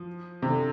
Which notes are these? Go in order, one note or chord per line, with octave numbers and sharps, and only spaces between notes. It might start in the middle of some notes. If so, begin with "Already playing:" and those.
Already playing: F3
C3
D3